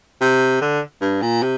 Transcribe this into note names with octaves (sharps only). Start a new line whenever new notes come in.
C3
D3
G2
A#2
C3